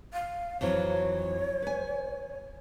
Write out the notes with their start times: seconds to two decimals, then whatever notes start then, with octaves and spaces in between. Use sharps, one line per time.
0.13 F5
0.61 F2 E3 F#3 C#5
1.62 B4 G#5